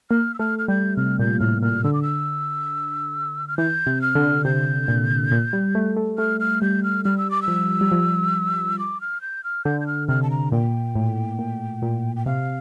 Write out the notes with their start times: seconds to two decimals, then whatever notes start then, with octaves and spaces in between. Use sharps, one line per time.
0.10 A#3 F6
0.34 E6
0.39 A3 F6
0.59 F6
0.68 G3 G6
0.97 C3 F6
1.19 A#2 G6
1.40 A2 F6
1.62 A#2 F6
1.84 D3 E6
1.93 D6
2.03 E6
3.48 F6
3.58 E3 G6
3.86 C3
4.02 F6
4.15 D3
4.45 C3 G6
4.88 A#2
5.31 A#2
5.53 G3
5.75 A3
5.96 A3
6.18 A3 F6
6.40 F6
6.62 G3 G6
6.84 F6
7.05 G3 F6
7.18 E6
7.31 D6
7.42 E6
7.48 F3
7.81 G3
7.92 F3
8.79 D6
9.01 F6
9.21 G6
9.44 F6
9.65 D3 G6
9.81 G6
9.87 F6
10.08 C3 F6
10.22 A5
10.31 A#5
10.52 A#2 G5
10.95 A2
11.39 A#2
11.82 A#2
12.16 G5
12.26 C3 F5